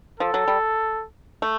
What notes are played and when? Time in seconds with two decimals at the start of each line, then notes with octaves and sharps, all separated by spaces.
0.20 F3 A4
0.34 F#3
0.48 G3
1.42 A3